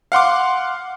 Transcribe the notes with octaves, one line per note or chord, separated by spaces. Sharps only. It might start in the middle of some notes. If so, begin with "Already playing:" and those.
F5 F#5 C6 D6